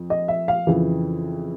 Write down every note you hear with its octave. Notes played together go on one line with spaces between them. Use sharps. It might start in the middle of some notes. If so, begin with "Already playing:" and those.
Already playing: F2
D#5
E5
F5
F2 C#3 E3